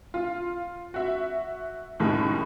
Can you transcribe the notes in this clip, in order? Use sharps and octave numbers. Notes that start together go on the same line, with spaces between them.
F4
F#4 E5
F#1 D#2 A2 D#3 G#3 B5